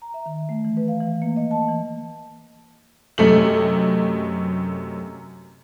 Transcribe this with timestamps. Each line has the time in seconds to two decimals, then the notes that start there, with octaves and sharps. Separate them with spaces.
0.02 A#5
0.14 E5
0.26 D#3
0.49 A3
0.65 E3
0.77 B4
0.88 F5
1.01 E3
1.22 A#3
1.36 D#5
1.51 A5
1.69 E3
3.18 F#2 C3 A3 D#5 F#7